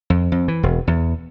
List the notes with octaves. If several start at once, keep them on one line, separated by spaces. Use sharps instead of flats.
F2
F2
E3
E1
E2